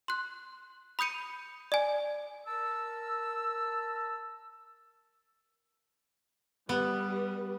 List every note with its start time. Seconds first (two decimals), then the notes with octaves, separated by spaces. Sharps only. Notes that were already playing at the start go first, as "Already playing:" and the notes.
0.08 C6 F#6
0.99 B5 D#6 G6 C#7 D#7
1.72 D5 G#5
2.46 A#4 A5 E6
6.69 G3 B3 B4